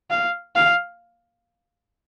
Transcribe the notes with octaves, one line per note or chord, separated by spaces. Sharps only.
F5
F5